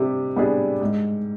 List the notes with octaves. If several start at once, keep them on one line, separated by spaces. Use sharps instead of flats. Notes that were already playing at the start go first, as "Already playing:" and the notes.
Already playing: C3 G3 D4
G3 B3 D4 G#4
G#2